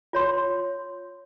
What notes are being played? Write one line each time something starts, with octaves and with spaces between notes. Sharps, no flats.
F4 C#5 C6